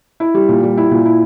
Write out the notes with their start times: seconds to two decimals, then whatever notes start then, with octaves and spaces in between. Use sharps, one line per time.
0.20 E4
0.34 G3
0.49 A#2
0.63 G3
0.77 E4
0.91 A#2
1.05 E4